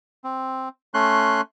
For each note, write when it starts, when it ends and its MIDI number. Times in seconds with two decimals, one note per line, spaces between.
0.24 0.69 60
0.94 1.41 57
0.94 1.41 61
0.94 1.41 84
0.94 1.41 90